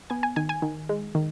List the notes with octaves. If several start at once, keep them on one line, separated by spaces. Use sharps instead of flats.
B3 G#5
G#5
D#3 G#5
G#5
D#3
G#3
D#3